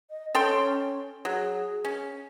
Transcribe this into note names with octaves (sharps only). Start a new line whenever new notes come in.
D#5
C#4 A4 G5 C6
F#3 G#4
C#4